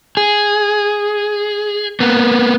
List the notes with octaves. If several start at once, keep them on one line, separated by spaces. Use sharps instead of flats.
G#4
A#3 B3